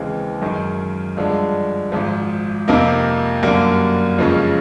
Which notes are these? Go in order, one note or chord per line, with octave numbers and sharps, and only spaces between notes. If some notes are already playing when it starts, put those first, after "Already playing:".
Already playing: D#2 C#3 E3 G#3 C4
F#2 D#3 G#3
G2 D3 F3 G#3
G#1 G#2 F3
F2 C3 F3 A#3 D#4
F#2 D3 G3 A#3
F2 C#3 F3 G#3 C#4